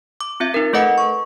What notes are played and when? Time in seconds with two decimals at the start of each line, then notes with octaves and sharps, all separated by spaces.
0.21 D6
0.40 C4 F4 E5
0.54 D#4 A#4
0.73 A3 A4 B4 D#5 F#5 C#7
0.98 C#6